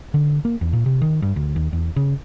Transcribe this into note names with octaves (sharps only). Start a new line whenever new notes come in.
D3
A#3
E2
A#2
C3
D#3
G2
D2
D#2
E2
C#3